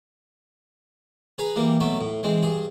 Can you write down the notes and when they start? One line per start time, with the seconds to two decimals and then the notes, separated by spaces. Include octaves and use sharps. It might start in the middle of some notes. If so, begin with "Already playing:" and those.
1.38 G#4 B4 G#5 A#5
1.56 E3 G3 A#3
1.80 B2 F#3 A3 E5
2.01 A2
2.23 E3 G#3 C4
2.43 G2 G#4